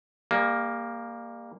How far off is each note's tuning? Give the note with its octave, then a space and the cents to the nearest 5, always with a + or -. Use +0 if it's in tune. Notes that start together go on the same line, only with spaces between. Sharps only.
G3 +40 A#3 +0